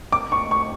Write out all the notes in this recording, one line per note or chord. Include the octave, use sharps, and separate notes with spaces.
D6
C#6
C#6